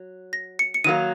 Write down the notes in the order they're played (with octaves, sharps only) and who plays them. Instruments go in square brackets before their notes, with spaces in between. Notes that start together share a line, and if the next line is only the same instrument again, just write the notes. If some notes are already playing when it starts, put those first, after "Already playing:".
Already playing: [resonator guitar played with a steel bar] F#3
[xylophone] A#6
C#7
C#7
[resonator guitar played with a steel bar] D#3 F#3 A#3 [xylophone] D#7